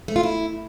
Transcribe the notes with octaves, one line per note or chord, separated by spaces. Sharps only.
A3
F4
E4